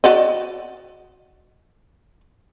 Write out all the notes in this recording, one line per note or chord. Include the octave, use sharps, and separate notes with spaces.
F#4 D5 D#5